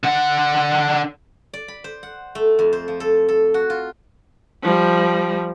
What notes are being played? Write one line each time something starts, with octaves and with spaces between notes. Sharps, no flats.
D3 F#5
D5
B5
C5
F#5
A3
F2
C5
F3
A4
A4
F#4
F4
F3 G3